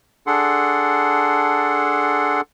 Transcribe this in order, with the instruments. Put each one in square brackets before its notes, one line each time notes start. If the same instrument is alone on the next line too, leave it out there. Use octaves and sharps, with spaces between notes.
[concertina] D4 G#4 A4 F#5 C6